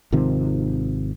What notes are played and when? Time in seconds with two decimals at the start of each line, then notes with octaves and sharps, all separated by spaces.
0.12 G#1 C3 D#3 F3